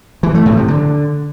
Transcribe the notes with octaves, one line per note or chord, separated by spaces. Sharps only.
E3
A3
A2
C3
D3